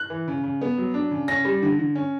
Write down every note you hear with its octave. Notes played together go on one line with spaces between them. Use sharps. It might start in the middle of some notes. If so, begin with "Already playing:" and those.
Already playing: F#6
E3
C#3
C#3
B3
F#3
D4
C#3
C#4 A#6
G3
D3
D3
C#4